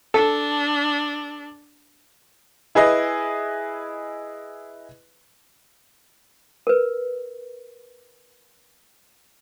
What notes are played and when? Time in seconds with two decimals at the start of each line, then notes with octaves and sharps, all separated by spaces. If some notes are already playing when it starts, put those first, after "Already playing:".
0.14 D4 A4
2.75 E4 G#4 B4 D#5
6.67 A#4 B4